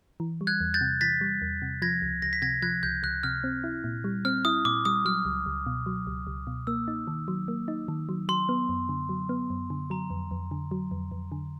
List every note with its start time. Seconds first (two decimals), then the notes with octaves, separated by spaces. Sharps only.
0.20 E3
0.41 G3
0.47 F#6 G#6
0.61 E2
0.74 G6 A6
0.81 C3
1.01 E3 A6 B6
1.21 G3
1.42 E2
1.62 C3
1.82 F3 G#6 A#6
2.02 C#2
2.22 C#2 A#6
2.33 B6
2.42 C3 G#6 A#6
2.62 F3 F#6 G#6
2.83 C#2 G6
3.03 C#2 F#6
3.23 C3 F6
3.44 C4
3.64 E4
3.84 A#2
4.04 G3
4.25 C4 F6
4.45 E4 D#6
4.65 A#2 D6
4.85 G3 D#6
5.05 F#3 F6
5.25 C#2
5.46 C#2
5.66 B2
5.86 F#3
6.07 C#2
6.27 C#2
6.47 B2
6.67 A#3 E6
6.88 D#4
7.07 D#3
7.28 F#3
7.48 A#3
7.68 D#4
7.88 D#3
8.09 F#3
8.29 F#3 C6
8.49 B3
8.69 F#2
8.89 D3
9.09 F#3
9.29 B3
9.50 F#2
9.70 D3
9.90 F#3 A#5
10.10 F2
10.31 F2
10.51 D3
10.71 F#3
10.91 F2
11.11 F2
11.32 D3